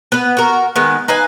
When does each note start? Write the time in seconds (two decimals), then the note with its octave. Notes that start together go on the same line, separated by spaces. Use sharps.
0.12 B3 B4
0.37 F#4 A#4
0.76 D#3 G#3 B3
1.08 D#4 B4 F5 G#5